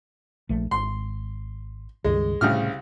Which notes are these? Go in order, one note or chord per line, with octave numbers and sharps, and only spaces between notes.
A#1 F3 A3
G#1 C6
C#2 G2 D#3 G#3
C2 A2 C#3 F6